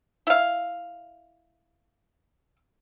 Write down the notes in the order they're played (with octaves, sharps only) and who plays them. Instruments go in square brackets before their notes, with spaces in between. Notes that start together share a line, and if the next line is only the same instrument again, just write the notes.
[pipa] E4 F5